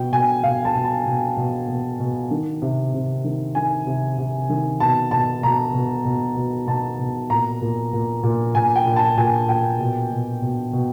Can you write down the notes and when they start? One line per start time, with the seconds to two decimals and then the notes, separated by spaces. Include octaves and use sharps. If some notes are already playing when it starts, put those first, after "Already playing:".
Already playing: B2 G5
0.12 B2 G#5
0.43 B2 F5
0.65 A5
0.75 B2
0.85 A5
1.06 B2
1.37 B2
1.68 B2
2.00 B2
2.31 D#3
2.62 C3
2.94 C3
3.24 D#3
3.55 D#3 G#5
3.86 C3
4.18 C3
4.49 D#3
4.80 B2 A5
5.11 B2 A5
5.43 B2 A#5
5.74 B2
6.05 B2
6.37 B2
6.67 B2 A5
6.99 B2
7.30 A#2 A#5
7.62 A#2
7.93 A#2
8.23 A#2
8.55 A#2 G#5
8.76 G5
8.86 A#2
8.96 A5
9.17 A#2 G#5
9.49 A#2 G5
9.80 B2
10.11 B2
10.42 B2
10.73 B2